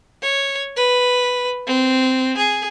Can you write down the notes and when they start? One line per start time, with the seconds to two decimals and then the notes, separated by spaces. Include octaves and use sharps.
0.23 C#5
0.77 B4
1.67 C4
2.37 G#4